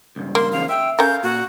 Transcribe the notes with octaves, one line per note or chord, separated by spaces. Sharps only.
C#2 G2
A#3 C6
E2 C#3 F3 F5
E5 G5
C#4 A4 A#4 F5 G6
A#2 F#4